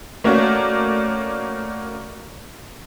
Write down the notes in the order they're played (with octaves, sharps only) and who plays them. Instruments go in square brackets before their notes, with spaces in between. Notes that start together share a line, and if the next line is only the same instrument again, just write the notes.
[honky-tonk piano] A3 A#3 C#4 F#4 D5